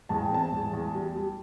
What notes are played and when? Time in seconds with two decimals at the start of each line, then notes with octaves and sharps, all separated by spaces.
0.09 E2 A5
0.22 G5
0.31 C4 A5
0.52 E2
0.73 E2
0.95 G3
1.16 G3